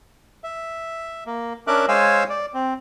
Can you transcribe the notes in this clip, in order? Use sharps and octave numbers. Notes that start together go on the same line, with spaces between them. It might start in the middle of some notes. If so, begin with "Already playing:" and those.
E5
A#3
C#4 D4 A#4 E5 D6 F#6
G#3 C5 C#5 F5 G#5 E6
D5
C4